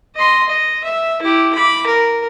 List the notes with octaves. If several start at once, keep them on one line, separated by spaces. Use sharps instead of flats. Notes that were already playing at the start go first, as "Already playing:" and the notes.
D#5 C6
D#5
E5
E4 G4
B5 D6
A#4